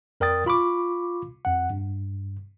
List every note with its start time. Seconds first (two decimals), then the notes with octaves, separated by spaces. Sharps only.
0.20 F2 A#4 D5 G5 D#6 A6
0.46 F4 B5 C#6 D6
1.45 F2 F#5
1.70 G2